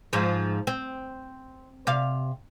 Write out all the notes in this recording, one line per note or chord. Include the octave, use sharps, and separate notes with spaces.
G#2 F3
C4
C3 F5